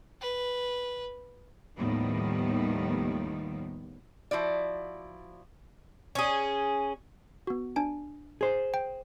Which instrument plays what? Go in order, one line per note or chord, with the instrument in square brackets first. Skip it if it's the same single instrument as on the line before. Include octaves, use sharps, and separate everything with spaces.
[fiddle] B4
[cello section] D#2 A2 D#3 F3 G3 B3
[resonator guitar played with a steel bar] F3 E4 F#4 D5
[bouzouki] C#4 G#4
[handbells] B3 F#4
D4 G#5 D7
[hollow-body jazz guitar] G#4 C5
[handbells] G5